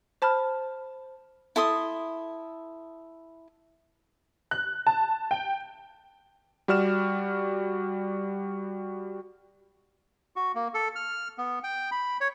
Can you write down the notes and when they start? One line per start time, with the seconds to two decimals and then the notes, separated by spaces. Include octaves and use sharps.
0.22 C5 A5 B5 F6
1.56 E4 A4 C6 D#6
4.51 F#6
4.87 A5
5.31 G5
6.68 G3 F#4 D5 F6 E7
10.36 F#4
10.55 A#3
10.74 A4
10.96 F6
11.38 B3
11.64 G5
11.91 B5
12.21 C#5